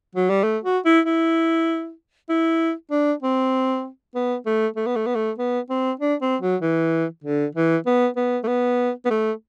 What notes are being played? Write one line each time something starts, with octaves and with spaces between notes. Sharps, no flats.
F#3
G3
A3
F#4
E4
E4
E4
D4
C4
B3
A3
A3
B3
A3
B3
A3
B3
C4
D4
C4
F#3
E3
D3
E3
B3
B3
A3
B3
B3
A3